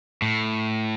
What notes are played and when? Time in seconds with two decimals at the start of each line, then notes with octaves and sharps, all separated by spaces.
0.22 A2